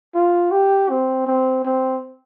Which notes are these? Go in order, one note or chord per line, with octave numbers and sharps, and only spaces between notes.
F4
G4
C4
C4
C4